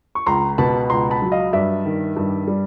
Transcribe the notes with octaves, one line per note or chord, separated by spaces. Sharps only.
C#6
C#2 A#5 C6
B2 A5 B5
C#2 A#5 C6
A5 B5
F#3
D#5 F5
G2 D5 E5
D#3
G2
G3